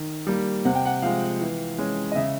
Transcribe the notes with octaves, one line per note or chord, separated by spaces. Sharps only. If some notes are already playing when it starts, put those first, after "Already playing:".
Already playing: D#3
G3 A#3
C3 F#5
G5
F#5
F3 G#3 F5
E3
G#3 C#4
D#5
C#3 E5